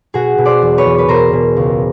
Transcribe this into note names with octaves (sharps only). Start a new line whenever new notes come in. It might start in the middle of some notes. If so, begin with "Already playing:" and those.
B2 F#4 G#4
B2
C5 D5
E2
B4 C#5
E2
B4
B2 A#4 C5
B2
C#2